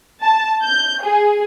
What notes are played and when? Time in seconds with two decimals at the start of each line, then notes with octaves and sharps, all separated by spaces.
0.23 A5
0.63 G6
1.03 G#4